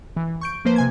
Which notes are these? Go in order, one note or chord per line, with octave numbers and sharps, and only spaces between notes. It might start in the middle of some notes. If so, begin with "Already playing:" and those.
E3
C#6 G6 D7
F3 A#3 B4 C5
C3 G#5 G#6